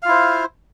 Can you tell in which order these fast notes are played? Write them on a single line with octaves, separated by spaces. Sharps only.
F5 F4 E4 C5